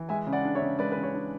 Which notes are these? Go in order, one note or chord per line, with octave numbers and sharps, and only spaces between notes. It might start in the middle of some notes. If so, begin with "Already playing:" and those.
Already playing: E3
G#3 E5 G#5
C#3
D5 F#5
D4
C#5 E5
C#3
G#3 B4 D5
B4
C#3
C#5
D4